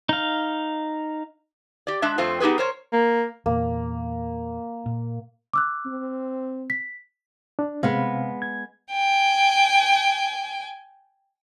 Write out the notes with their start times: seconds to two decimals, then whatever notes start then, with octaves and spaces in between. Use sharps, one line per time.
0.09 D#4 F5
1.87 G4 D5
2.02 G#3 D4 E5
2.18 F2 A3 C4 F4
2.40 B3 D#4 G4 G#4 B4
2.58 A#4 C5 C#5
2.93 A#3
3.46 E2 A#2 A#3
4.86 A#2
5.53 D6 E6 F#6
5.85 C4
6.70 B6
7.59 D4
7.83 C3 G#3 B3 C4 F5
8.42 G#6
8.92 G5 G#5